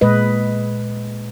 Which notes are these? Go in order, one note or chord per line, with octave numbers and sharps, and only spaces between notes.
A#2 G#3 B4 D#5